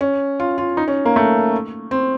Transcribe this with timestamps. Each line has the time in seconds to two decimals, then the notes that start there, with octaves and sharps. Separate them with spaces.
0.01 C#4
0.40 F4
0.58 F4
0.77 D#4
0.88 C#4
1.05 A#3
1.16 A3
1.91 C4